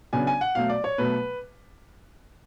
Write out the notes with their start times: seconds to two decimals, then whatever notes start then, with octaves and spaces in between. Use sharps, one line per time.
0.13 C#3 F#3 B3 D4 G#5
0.27 G#5
0.41 F#5
0.55 B2 F#3 A3 F5
0.70 D5
0.84 C#5
0.98 B2 F#3 A3 B4